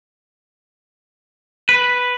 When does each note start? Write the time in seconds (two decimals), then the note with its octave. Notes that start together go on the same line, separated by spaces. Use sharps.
1.69 B4